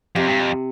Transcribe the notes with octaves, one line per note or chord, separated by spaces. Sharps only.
F2 C3
G2
F2